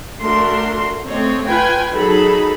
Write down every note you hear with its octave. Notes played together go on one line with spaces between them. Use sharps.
A3 D4 F#4 A#4 C6
A3 C4 C#5 D#5
F4 B4 G5 G#5
F#3 D#4 G#4 A4 B5